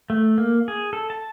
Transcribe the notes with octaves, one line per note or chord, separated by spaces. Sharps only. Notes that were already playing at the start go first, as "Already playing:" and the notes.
A3
A#3
G#4
A4
A5